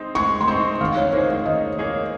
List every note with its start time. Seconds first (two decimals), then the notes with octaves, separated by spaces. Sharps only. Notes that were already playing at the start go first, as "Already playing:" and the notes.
Already playing: G#3 C4 D#4
0.15 G#3 C#6
0.41 C6
0.48 C4 D#4 C#6
0.80 D#3 F5
0.97 C#5
1.13 A#3 D#4 G#4 C5
1.30 F5
1.45 D#3 D#5
1.78 A#3 D#4 G#4 C#5